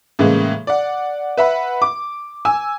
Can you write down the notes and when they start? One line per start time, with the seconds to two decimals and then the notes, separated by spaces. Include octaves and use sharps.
0.19 A2 C#3 E3 G#3 A#3
0.67 D5 F#5
1.37 B4 E5 F#5 B5
1.82 D6
2.45 G#5 E6 G#6